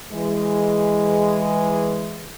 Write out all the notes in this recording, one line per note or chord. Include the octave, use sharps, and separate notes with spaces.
E3 G#3